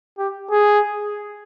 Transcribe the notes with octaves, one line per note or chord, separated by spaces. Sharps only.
G4
G#4